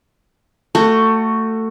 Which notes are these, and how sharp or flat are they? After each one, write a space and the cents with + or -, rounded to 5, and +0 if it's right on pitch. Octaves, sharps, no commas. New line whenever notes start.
A3 +20 F#4 +0 A4 +25